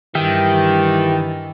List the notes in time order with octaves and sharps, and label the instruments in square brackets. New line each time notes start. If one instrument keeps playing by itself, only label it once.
[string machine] G2 A6 [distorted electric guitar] D#3 [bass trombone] E3 [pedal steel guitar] G4 E5